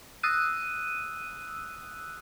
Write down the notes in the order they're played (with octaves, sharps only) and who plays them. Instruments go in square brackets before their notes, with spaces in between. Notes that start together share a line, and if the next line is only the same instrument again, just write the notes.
[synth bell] D#6 E6 F#6 D#7